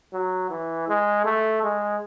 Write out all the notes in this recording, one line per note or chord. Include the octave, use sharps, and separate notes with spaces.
F#3
E3
G#3
A3
G#3